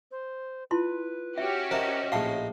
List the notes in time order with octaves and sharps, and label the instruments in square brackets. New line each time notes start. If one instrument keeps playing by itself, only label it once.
[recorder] C5
[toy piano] E4 F4 C6 [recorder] B4
[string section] C#4 F#4 G4 [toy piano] E5
[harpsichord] A#4 A5 [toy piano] C5 E5 [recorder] D#5
[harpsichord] A#1 A2 C6 [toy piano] F5 A5